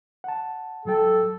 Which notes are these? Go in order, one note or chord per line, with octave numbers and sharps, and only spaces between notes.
F#5 A5
G#2 F#3 A4 G5